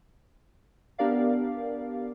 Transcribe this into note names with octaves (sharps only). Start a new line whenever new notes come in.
B3 D4 G4 A#4 D5 F5